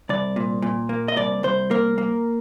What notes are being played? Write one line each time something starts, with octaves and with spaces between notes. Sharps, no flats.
C2 D5
A#2
A#2
A#3
D#5
C2 D5
C2 C5
A#3 A#4
A#3